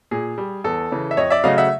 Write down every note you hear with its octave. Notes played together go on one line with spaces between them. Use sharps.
A#2 G#4
G3
E2 A4
C#3 E3
E5
F2 C#5 D#5
D5 E5
C#3 F#3 A3 D#5 F5
E5 F#5